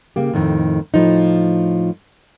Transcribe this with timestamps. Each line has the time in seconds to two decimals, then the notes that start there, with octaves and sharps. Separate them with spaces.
0.16 C#3 A#3 G4
0.33 F2 A2 D#3
0.94 A2 F3 D#4